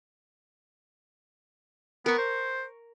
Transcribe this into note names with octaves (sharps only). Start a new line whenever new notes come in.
B3 A#4 C#6
C5